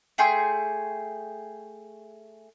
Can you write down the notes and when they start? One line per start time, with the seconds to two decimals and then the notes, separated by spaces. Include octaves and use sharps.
0.18 A3 G#4 G5 C6